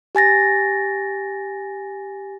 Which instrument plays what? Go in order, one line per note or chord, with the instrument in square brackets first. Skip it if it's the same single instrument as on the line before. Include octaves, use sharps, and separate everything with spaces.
[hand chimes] G4 G#5 A6 A#6